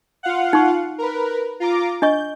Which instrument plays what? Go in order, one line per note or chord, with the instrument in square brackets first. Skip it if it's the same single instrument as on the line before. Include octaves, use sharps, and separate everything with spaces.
[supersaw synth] F4 F5 F#5
[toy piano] D#4 C#6
[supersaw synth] A#4 B4
F4 A#5 D6
[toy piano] D4 D#5 C#6 [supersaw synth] G6